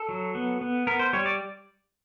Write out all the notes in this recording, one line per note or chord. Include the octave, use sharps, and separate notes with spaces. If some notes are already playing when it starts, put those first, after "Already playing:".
Already playing: A4
F#3
B3
B3
B3 A#4
C5
G3 C#5
D5